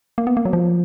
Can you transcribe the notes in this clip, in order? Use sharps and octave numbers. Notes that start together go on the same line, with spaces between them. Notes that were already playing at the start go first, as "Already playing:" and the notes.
A#3
B3
A#3
F#3
F3